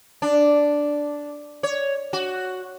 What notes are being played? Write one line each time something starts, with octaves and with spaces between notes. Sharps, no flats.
D4
C#5
F#4